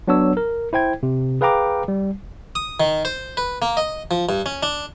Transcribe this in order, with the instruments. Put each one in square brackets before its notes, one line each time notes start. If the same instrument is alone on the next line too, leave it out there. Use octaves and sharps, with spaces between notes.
[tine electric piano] F#3 B3 D4 C#5 E6
A#4
E4 C5 G5 G#6
C3
G#4 B4 F5 G5 A#5 D6
G3
[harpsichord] D#6
D#3
C5
B4
A#3
D#5
F3
G2
C#4
D4